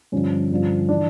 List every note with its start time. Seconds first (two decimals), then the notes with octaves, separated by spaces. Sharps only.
0.12 G2 D3 F3 C#4
0.51 G2 D3 F3
0.89 E3 D4